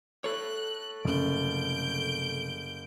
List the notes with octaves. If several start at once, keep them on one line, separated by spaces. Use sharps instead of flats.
A4 C#5 F#6
F#1 C3 F3 A3 G6 D7